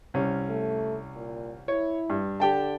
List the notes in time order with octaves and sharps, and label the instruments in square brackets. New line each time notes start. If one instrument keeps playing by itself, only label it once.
[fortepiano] C2 C#4
[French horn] A3
A#2
[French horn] E4 [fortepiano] C#5
[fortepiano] G2
[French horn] D3 [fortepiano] G4 G5 A5